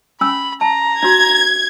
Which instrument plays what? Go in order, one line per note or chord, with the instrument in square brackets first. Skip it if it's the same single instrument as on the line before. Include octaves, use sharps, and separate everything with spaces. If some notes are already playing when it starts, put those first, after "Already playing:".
[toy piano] C#4 G#5 E6 [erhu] B5
[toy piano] A5 [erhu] A#5
[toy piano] D4 F#4 [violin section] G#6